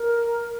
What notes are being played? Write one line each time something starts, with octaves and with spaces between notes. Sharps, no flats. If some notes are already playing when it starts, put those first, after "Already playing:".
Already playing: A#4